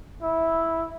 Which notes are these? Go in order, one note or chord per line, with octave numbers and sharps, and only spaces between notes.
E4